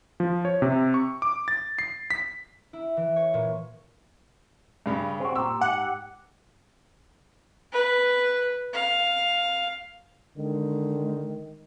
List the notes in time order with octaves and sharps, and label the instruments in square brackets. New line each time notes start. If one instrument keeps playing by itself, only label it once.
[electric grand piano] F3
C#5
C3
C#6
D6
A6
C7
B6
[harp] E4
E3
C#5
A#2
[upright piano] G2 C#3 B5
[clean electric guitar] C4 F#4
[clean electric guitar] A#2 G4 [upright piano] E6
[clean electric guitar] G#2 G4 [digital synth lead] F#5
[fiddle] B4
F5
[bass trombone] D3 [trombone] D#3 [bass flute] G#3